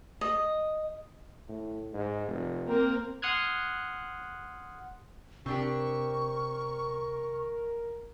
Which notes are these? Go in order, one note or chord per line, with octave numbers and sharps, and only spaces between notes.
D#5
A2
G#2
F1
A#3 C4 A#4
F#5 C6 D#6 F6 F#6 G#6
C3 C4 D4 G4 A#4 C#6